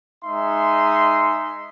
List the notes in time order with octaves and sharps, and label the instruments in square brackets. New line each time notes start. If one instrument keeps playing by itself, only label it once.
[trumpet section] G#3 D#4 E5 C6